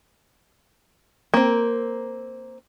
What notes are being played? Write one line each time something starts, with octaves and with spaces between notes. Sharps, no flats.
A#3 C4